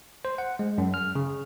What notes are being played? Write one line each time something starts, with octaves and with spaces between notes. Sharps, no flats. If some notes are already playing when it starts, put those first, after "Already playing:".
C5
F#5
G#3
F#2
F6
C#3